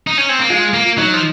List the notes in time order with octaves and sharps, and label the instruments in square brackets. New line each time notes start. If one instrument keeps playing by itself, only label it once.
[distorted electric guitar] D#4
C#4
C4
A#3
[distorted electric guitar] G#3 [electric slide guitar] F4
[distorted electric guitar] A#3
[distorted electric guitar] F#3 [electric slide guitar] D#4
[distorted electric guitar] F3